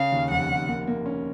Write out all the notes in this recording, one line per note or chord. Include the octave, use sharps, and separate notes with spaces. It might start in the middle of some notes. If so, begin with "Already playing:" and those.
Already playing: C#3 F5
D#2
F1 F#5
F1
A#3
A#3
C#4